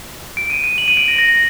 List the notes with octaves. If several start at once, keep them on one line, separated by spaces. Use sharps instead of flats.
D7
D#7
D#7
F#7
D#7
D7
A#6
A#6